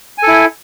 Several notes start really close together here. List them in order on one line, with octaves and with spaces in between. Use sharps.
G#5 A4 E4